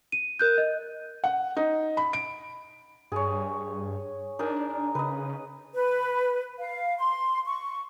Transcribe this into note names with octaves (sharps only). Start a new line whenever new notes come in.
D#7
A#4 F#6 G6
D#5
F#5
D#4
B5
D7
G2 G#4 C#5
D4 D#4 A#4 G#5
C#3 B4 D#5
B4
F5
C6
C#6